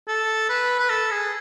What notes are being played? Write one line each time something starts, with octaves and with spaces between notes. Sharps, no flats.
A4
B4
B4
A4
G#4